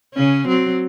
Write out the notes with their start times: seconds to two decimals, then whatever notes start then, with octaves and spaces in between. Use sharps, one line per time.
0.14 C#3 C#4
0.48 F#3 C4